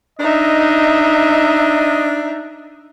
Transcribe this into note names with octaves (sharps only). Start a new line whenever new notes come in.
D4 D#4 D#5 E5